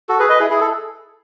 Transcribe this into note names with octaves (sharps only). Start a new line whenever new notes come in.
F#4 A4
G#4 B4
B4 D#5
E4 G#4
E4 G#4
A4